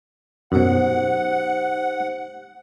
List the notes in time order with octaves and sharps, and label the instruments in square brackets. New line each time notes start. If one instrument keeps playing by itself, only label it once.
[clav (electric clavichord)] F#2 B2 [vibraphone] D#4 G4 C5 [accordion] F#5